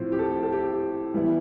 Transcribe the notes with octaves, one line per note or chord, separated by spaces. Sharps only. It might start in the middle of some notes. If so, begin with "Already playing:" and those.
Already playing: A2 F3 C4
G4
A4
A4
G4
G4
E3 G3 B3 E4